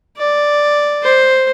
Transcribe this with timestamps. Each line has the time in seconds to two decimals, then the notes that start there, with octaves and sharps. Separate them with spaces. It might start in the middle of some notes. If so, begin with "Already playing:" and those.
0.17 D5
1.03 C5